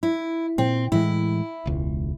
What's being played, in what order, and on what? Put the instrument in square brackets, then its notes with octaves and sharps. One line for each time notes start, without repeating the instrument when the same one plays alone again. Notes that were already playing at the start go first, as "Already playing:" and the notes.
[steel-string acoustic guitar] E4
[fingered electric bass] A#2 [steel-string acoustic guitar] C4
[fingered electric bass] A2 E3 G#3 [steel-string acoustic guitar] E4
[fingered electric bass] E1 C#2